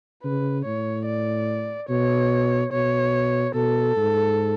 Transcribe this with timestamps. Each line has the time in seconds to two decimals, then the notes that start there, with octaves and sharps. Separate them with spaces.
0.23 C#3 B4
0.65 A2 C#5
1.06 D5
1.89 B2 C#5
2.72 B2 C#5
3.54 B2 A4
3.97 G#2